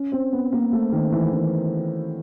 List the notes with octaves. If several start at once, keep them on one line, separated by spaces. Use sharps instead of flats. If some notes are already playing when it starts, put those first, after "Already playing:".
Already playing: C#4
C4
B3
A#3
A3
D#3
E3
E3